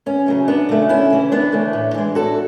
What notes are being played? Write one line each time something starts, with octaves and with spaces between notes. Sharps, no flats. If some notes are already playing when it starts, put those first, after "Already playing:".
E2 C#4
C#3 F#3 A3
E2 B3 D4
C#3 F#3 A3
D2 C#4 E4
C#3 E3 A3
D2 B3 D4
C#3 E3 A3
A2
E3 G#3
A2 F#4 A4